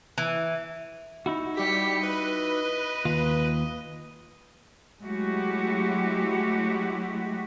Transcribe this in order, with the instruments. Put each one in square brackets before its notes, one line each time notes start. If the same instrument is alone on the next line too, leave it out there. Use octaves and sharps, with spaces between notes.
[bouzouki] E3
[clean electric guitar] D#4 E4 F#4
[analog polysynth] G3 G4 [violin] B6 C#7
[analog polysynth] B4 [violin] D#5
[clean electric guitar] D#2 F4
[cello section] F#3 G#3 A3 E4 F#4 G4